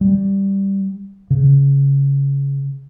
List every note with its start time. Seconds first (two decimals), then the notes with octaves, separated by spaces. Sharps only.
0.01 G3
1.30 C#3